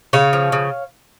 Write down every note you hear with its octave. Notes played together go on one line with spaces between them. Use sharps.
C#3 C#5 F5
F3
C#3